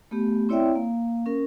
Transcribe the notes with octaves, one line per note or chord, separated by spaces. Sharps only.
A3 B3 G4
C4 E4 C#5 D5 E5 G5
A#3 F5
C#4 A#4